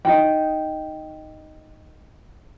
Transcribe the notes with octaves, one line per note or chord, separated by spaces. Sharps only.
D#4 F4 G5